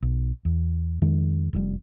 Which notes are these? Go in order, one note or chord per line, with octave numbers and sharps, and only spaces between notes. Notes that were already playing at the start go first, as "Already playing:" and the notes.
B1
E2
F2 D#3 G#3
F1 F2 G3